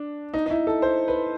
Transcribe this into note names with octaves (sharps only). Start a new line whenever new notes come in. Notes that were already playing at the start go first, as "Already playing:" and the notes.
Already playing: D4
D#4
D#4
E4
A4
C5
B4